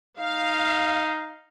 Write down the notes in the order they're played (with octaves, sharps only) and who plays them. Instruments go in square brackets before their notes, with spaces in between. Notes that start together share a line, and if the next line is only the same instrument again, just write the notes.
[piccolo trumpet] D#4 [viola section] F5